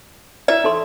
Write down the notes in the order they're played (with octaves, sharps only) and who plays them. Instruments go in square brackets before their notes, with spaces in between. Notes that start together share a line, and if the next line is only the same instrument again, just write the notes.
[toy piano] E4 D5 [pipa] E5
[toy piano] D#4 A4 C6